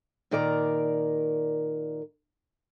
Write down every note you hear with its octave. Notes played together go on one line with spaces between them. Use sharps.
A#2 D#3 A#4 D5 A#5